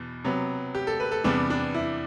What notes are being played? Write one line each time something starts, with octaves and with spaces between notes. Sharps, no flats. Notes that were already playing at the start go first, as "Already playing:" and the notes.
Already playing: E2 B2
C3 F#3 B3
G4
A4
B4
A4
E2 C3 G3 B3 D4
D4
E4